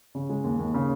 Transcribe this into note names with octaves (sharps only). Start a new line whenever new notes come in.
C#3
G#3
D#2
D#2
C#3